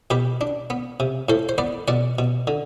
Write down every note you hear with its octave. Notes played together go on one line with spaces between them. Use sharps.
B2 G4 B4
D4
B3
C3
A2 A4 C5
C5
B3 B4 D5
B2 D5 F#5
B2
D3